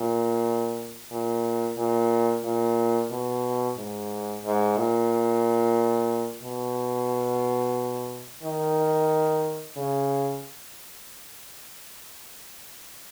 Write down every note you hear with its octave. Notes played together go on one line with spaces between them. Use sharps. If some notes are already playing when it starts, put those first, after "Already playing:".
Already playing: A#2
A#2
A#2
A#2
B2
G#2
G#2
A#2
B2
D#3
C#3